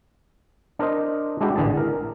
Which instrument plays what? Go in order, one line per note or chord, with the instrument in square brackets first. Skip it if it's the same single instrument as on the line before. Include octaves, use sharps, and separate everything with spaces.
[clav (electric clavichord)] D4 A#4 C5 D#5
G#3 D4 E4 F#4 G4
A1 D3 E3 G#4 A5
A#4